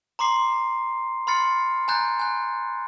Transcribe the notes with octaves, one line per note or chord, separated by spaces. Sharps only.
A#5 C6 D6 C7
B5 C6 F6 A6 C7 C#7
G#5 A#5 F#6 G6 A6
G#5 F#6